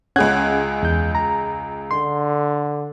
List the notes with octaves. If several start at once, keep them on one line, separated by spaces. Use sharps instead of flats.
C#2 C#4 G#4 F#5 F#6 G#6
E2 G6
A#5
D3 C6